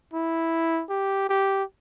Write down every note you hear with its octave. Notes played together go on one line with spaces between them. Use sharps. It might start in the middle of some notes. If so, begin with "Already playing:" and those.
E4
G4
G4